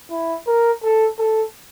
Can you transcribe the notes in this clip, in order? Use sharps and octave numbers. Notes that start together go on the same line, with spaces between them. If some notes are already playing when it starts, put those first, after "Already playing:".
E4
A#4
A4
A4